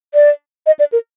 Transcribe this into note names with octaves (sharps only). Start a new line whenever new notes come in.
D5
D#5
D5
A#4